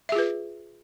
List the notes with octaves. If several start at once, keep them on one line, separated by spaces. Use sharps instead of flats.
F4 G#4 B4 E5